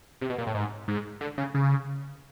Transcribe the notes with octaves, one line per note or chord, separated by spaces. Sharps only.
C3
B2
A#2
A2
G#2
G#2
D3
C#3
C#3